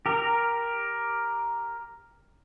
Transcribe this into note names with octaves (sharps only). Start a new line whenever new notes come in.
G4 A#4